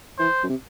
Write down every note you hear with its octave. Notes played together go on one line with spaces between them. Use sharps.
E3 C5
F#2
C3